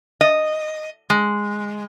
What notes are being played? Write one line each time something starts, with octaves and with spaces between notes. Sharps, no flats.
D#5
G#3